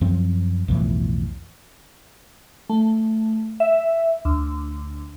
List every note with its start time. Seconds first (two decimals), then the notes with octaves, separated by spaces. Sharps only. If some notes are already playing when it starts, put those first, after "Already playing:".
0.01 F#2 F3 C4
0.68 B1 F2 A2 E3
2.69 A3
3.60 E5
4.25 D2